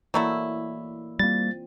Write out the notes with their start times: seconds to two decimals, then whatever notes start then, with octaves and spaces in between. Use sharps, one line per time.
0.14 E3 F#3 A3 A#3 E4 D5
1.19 G3 A#3 C4 F4 A6